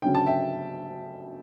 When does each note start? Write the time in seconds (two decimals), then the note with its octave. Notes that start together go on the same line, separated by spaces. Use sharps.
0.02 D2 C#3 F#3 C#4 G5
0.15 A5
0.26 E5 G5